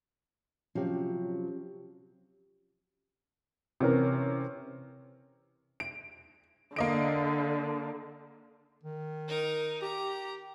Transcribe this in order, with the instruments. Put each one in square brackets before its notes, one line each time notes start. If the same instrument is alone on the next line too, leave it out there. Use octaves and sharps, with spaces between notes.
[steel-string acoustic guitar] C3 F3 F#3 [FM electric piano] C#4 G4
[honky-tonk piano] C3 E3 C#4 A#4
D7
[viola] D3 [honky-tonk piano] A#3 D#5 D7
[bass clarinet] D#3
[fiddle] D#4 A#4
[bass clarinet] G4 [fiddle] A#5